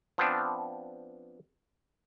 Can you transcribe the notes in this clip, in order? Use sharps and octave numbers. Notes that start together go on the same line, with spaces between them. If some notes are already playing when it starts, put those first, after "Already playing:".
F3 B3 C4 D4